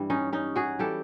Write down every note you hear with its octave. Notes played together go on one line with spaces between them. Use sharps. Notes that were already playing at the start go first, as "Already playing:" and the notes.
Already playing: G2 E3 G3
C#4 D#4
C#4 D#4
F#4 G#4
E3 G3 G4 A4